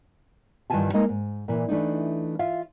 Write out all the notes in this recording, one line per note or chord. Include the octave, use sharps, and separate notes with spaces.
G2 D#3 E3 F4 G#5 A5
G#3 A#3 D#4 A#4 D#5
G#2
A#2 E3
E3 A3 D4 D#4
F4 E5 F5